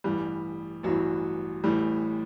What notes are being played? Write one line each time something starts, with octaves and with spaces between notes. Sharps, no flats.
A1 G2 E3 G3
A1 G2 E3 F#3
A1 A2 E3 G3